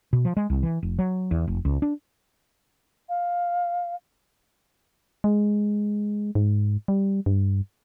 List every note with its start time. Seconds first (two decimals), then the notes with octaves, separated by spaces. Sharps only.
0.13 B2
0.25 F3
0.37 G#3
0.50 C2
0.63 E3
0.83 F1
0.99 F#3
1.31 E2
1.48 F1
1.65 C#2
1.82 D4
3.09 F5
5.24 G#3
6.35 G#2
6.88 G3
7.26 G2